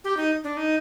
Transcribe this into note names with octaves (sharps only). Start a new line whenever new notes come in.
G4
D#4
D4
D#4